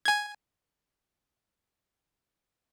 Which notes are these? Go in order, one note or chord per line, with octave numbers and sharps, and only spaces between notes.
G#5 G#6